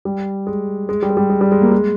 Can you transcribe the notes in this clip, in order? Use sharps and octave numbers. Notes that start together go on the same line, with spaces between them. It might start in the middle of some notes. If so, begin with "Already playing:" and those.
G3
G#3
G#3
G3
G#3
G3
G#3
G3
G#3
A#3
G#3